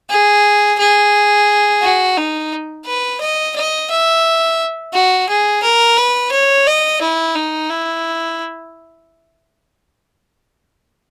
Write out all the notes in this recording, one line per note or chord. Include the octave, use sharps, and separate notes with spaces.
G#4
G#4
F#4
D#4
B4
D#5
D#5
E5
F#4
G#4
A#4
B4
C#5
D#5
E4
D#4
E4